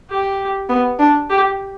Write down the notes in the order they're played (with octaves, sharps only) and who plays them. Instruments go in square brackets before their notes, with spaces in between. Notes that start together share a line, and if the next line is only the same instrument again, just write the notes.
[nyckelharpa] G4
[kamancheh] B3
D4
[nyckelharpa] G4